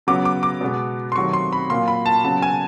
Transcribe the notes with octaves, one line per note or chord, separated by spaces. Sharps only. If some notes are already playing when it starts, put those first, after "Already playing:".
C#3 F#3 B3 D6
D6
D6
B2 G#3 B3
C6
C3 D#3 F#3 A3 C4 C#6
C6
B5
A#2 F#3 A#3 C6
B5
A5
C#3 F#3 B3 A5
G#5